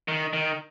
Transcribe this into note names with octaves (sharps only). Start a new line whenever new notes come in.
D#3
D#3